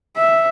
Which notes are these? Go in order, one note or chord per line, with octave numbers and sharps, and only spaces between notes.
E5